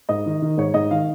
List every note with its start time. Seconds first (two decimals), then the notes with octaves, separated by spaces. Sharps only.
0.09 G#2 D#5
0.26 D#3
0.42 D#3
0.58 G#2 C#5
0.74 G#2 D#5
0.91 D#3 F5